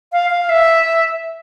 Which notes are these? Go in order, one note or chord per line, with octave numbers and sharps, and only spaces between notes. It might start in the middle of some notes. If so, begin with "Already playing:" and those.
F5
F5
E5